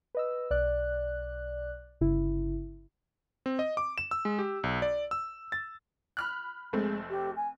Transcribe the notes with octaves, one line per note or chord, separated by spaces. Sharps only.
B4 D#5 E6
B1 D5 F#6
G1 C#3 E4
C4
D#5
D6
E7
E6
G#3
G4
B1
D5
E6
A6
B5 F6 F#6
F1 G#3 A3 C4
G4
G#5